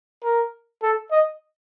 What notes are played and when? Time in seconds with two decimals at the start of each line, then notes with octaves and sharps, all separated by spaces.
0.24 A#4
0.83 A4
1.11 D#5